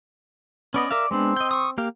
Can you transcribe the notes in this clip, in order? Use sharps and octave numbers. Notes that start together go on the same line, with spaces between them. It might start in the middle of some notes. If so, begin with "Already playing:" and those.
B3 C#4 D5 D#5
A#4 D5 E5 F5
G#3 B3 C4 D4
D#5 G5
C#6 D#6
A#3 G4 F5